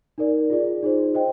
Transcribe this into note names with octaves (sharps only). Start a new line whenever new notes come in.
D#4 A#4 D5
F4 G#4 D5
D#4 G#4 C5
C5 D#5 G5